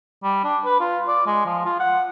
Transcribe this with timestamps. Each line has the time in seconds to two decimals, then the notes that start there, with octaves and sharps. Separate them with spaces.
0.24 G3
0.44 D4
0.65 B4
0.80 F4
1.08 D5
1.26 G#3
1.46 F3
1.66 F4
1.80 F#5